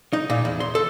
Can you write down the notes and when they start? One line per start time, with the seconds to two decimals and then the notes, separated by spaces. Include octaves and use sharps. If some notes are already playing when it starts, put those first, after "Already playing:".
0.13 D#4
0.30 A#2
0.45 E2
0.60 C6
0.75 A4